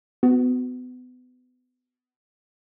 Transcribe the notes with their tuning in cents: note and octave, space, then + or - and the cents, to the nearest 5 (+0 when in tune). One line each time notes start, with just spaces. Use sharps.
B3 +30 F#4 +0